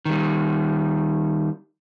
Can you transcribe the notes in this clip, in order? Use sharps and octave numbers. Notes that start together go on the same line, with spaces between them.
D#3 G3